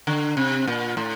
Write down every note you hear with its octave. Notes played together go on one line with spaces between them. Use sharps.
D3
C3
A#2
A2